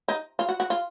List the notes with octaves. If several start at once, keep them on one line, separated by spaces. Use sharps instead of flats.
D#4
F4
F#4
F#4
F4